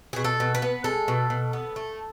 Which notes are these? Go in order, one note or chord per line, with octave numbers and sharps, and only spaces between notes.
B2 G#4
A4
B2
B4
B3
G#3 A4
B2
B2
B3
A3